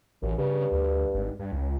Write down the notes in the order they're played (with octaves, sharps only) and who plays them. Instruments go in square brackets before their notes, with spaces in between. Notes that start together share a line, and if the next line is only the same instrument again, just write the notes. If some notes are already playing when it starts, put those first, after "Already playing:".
[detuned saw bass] A1 [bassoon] F#2
[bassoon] G2 [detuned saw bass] C#3
[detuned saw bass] D2
G#1
G2
C#2